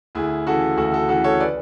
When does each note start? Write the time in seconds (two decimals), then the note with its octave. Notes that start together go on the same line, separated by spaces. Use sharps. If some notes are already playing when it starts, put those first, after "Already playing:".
0.15 D2 E4 G#4
0.46 C#3 E3 F#4 A4
0.77 D2 F#4 A4
0.93 F#4 A4
1.09 C#3 E3 F#4 A4
1.24 A4 C#5
1.40 B4 D5